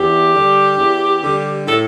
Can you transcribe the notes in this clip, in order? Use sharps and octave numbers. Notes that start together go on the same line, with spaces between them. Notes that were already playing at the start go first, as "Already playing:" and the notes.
Already playing: E2 G4
D3 G3
E2
D3 G3
A2 A4